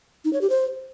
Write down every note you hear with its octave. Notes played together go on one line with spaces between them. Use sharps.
D#4
C#5
G4
C5